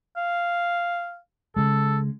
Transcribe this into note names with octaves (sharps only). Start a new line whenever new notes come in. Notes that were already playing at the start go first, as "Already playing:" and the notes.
F5
C#3 G#3 A4